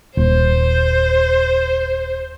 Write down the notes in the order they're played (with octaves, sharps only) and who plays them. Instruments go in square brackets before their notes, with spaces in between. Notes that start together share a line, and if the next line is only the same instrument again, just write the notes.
[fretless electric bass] D#1 [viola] C5